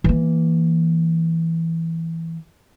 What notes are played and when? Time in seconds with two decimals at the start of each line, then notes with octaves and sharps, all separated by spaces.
0.04 E3 A#3